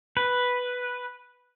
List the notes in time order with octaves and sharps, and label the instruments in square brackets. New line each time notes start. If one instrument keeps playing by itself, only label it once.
[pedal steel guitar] B4